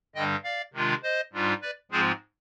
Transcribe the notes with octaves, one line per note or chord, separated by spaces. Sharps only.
G2 D3 G3 D4 D#5 G5
D5 F5
C3 D#3 G#3 D4 F4
C5 D#5
G#2 G3 D4 F4
B4 D5
G#2 F3 G#3 C4 F4 G#4 C5